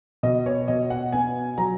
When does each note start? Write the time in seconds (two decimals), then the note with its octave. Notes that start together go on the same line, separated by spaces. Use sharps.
0.23 B2 D#5
0.46 C#5
0.68 B2 D#5
0.90 F#5
1.12 B3 G#5
1.58 F#3 A#5